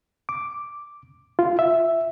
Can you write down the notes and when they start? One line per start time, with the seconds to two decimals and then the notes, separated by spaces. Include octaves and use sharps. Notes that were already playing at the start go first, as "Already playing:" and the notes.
0.29 D6
1.39 F4
1.59 E5